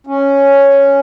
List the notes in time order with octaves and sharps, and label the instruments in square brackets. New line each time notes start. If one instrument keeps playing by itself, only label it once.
[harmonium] C#4